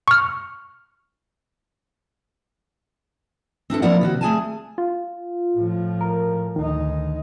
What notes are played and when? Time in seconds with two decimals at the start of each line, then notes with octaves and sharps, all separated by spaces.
0.08 C#6 F6
3.70 C4 D4 E4 A4
3.82 F3 A#3 E4 A#4 D5 F#5
4.01 C3 D#3 F#4
4.21 A3 G#4 G#5 A5
4.78 F4
5.56 A2 F3
6.01 A#4
6.56 D2 D#3 D#4